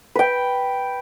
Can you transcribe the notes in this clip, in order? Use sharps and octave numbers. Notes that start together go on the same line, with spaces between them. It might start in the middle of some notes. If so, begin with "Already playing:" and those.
B4 G5